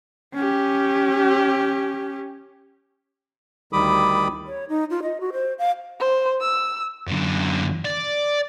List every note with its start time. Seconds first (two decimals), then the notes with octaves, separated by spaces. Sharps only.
0.35 C#4 G4
3.73 D2 D#3 G3 B5 D6 D#6
4.47 C#5
4.69 D#4
4.90 F4
5.03 D#5
5.21 F#4
5.33 C5
5.59 F5
6.00 C5
6.41 E6
7.08 F#2 D3
7.85 D5